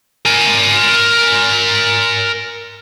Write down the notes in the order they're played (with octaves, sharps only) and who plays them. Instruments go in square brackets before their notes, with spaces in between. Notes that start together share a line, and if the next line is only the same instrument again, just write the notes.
[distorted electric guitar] A#4 G#5